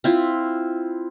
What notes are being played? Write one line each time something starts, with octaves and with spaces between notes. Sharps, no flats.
C4 E4 F4